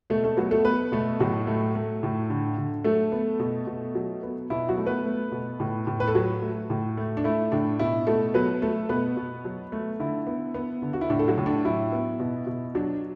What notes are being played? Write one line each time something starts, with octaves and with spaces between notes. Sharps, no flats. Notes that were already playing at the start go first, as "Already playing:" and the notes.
B2 A3 A4
A3 A4
F#3 B3 F#4
A3 A4
B3 B4
B2 A3 A4
A2 F#3 F#4
A3
A3
A2
D3
D3
F#3 A3 A4
B3
B2
B2
F#3
B3
B2 E4
F#3 F#4
A3
B3 B4
A3
B2
A2
A2
B4
A4
F#3 F#4
A3
A2
A3
D4
A3 E4
A2 D4
B2 E4
B2 A3 A4
F#3 B3 B4
A3 A4
B2 B3 B4
B2
F#3
A3
D3 E4
B3
B3
D3
F#4
E4
A2 D4
A4
F#3 F#4
A2
D4
F#3 E4
B3
B2
B2
F#3 D4